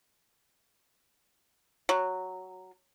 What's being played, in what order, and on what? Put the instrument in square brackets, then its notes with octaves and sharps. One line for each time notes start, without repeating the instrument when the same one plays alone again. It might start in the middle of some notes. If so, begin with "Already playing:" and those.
[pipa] F#3